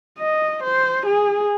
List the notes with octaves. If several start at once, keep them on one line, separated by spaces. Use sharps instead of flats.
D#5
C5
G#4